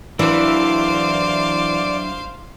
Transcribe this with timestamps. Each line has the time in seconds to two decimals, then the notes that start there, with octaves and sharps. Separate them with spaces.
0.19 E3 F#3 D4 C5 D5 F5